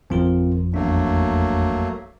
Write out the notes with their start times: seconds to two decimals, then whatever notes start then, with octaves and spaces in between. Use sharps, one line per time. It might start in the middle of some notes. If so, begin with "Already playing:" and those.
0.10 G#1 F2 F3 C4 F4 A#4
0.74 E2 F#3 A3 A#3 D4